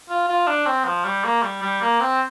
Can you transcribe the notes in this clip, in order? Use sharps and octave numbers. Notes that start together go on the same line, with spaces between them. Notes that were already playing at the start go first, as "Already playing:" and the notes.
F4
F4
D4
C4
F3
G3
A#3
G3
G3
A#3
C4